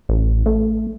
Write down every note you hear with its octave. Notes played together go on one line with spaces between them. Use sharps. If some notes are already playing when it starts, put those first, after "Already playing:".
A1
A3